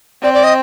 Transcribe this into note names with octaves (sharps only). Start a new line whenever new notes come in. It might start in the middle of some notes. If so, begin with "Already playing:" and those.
C4 D5
D5
D#5